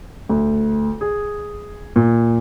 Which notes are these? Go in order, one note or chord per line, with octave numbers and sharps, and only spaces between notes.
D2
G#4
A#2